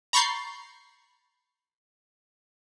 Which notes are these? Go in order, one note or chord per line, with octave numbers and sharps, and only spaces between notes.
A#5 B5 C#6 G6 A6 C7